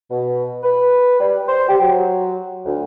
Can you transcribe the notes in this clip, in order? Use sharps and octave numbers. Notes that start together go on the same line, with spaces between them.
B2
B4
G3
C5
G4
F#3
D2